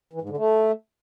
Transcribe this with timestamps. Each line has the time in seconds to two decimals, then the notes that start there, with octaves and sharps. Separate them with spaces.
0.13 E3
0.21 G#2
0.29 D3
0.37 A3